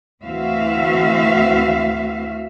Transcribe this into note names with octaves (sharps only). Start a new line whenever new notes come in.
D2 E3 C4 F#4 E5 F5